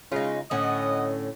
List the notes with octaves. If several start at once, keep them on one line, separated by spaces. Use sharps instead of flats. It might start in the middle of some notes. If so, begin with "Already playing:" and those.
C#3 G#3 D#4 F4
A2 D3 C#4 D#5 F#5